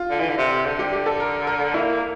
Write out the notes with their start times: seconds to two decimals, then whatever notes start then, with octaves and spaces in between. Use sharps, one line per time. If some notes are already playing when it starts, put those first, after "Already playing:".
Already playing: F4
0.10 D3
0.20 E3
0.29 D3
0.38 C3
0.66 D3
0.79 G4
0.93 G4
1.06 A4
1.20 A#4
1.47 A#4
1.74 A#3 E4